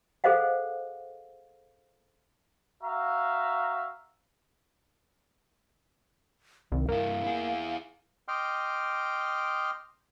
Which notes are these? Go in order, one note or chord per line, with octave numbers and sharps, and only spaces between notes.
G#4 A4 C5 D#5 F5 F#5
F#4 E5 F5 A#5
C2 D#3
G2 A#3 E4 F5
E4 G#4
D#5 G5 C6 D6 F6